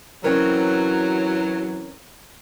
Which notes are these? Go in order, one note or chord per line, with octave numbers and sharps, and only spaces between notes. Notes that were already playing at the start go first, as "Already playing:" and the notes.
E3 F#3 C4 C#4 A#4